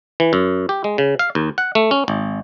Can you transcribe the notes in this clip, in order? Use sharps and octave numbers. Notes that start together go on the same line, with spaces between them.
E3
F#2
G4
G#3
C#3
F5
D#2
F#5
A3
C#4
G#1